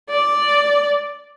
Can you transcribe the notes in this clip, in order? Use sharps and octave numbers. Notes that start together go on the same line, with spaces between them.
D5